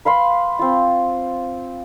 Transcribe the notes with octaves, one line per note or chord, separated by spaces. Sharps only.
B4 F5 B5 C6
C4 F4